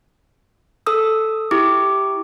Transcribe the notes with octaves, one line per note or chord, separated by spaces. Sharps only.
A4 D#6 E6
E4 G4 D6